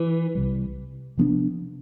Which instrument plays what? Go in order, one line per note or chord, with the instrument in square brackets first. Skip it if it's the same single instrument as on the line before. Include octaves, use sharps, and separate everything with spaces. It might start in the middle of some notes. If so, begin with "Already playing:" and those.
Already playing: [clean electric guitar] E3
[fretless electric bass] C2 C3 G3
C3 F3 B3 D4